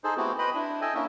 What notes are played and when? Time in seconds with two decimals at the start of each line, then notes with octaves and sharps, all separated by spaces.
0.04 D#4 G#4 A4 C5
0.17 A3 B3 C4 E4 F#4 G4
0.38 B4 C5 D#5 G5 B5
0.54 D4 E4
0.81 A4 D#5 E5 G5 G#5
0.95 A#3 C#4 D4 E4 A4